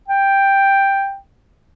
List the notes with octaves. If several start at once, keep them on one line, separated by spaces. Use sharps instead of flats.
G5